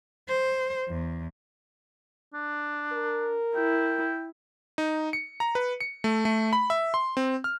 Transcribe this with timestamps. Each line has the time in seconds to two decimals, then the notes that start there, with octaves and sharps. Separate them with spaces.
0.28 C5
0.88 E2
2.34 D4
2.92 A#4
3.56 E4 G5
4.78 D#4
5.13 C#7
5.40 A#5
5.55 B4
5.81 C#7
6.04 A3
6.25 A3
6.53 B5
6.70 E5
6.94 C6
7.17 C4
7.44 F6